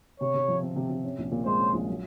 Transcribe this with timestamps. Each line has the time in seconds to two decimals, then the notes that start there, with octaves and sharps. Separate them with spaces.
0.20 C3 C#5
0.34 C3
0.48 F3
0.63 C4
0.76 C3
0.90 C3
1.04 C#4
1.18 A#1
1.31 A#2
1.45 G#3 C5
1.60 C#4
1.74 A#1
1.88 F#3